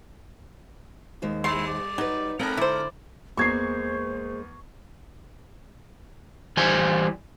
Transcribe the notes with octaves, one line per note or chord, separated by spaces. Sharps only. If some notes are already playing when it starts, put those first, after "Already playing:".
D#2 G#3 C5
G3 E4 C6
D5
F#3 D#4 B4
G#3 B3 C4 A4 A#4
D3 E4 C5 D5
E2 G#3 A#3 C5 C#6 G#6 C7
E3 G3 C5 G#5